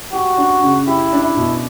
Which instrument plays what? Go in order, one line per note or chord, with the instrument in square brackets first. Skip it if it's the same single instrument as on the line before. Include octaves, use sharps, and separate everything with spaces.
[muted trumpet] F#4 [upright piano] G4
[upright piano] D4
C#3
[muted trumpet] E4 [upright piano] G4
[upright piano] D4
[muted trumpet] E4
[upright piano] B2